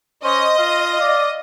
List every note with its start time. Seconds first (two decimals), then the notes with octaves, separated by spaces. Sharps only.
0.24 C#4 C5 D#5
0.59 F4 F5
1.00 D5